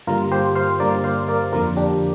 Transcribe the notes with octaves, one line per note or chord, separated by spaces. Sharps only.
G2 D3 G3 A#3 F4 A#4
G4 C5
C5 F5
G2 D3 G3 A#3 A#4 D5
C5 F5
A#4 D5
F2 D3 F3 A#3 F4 A#4
D4 G4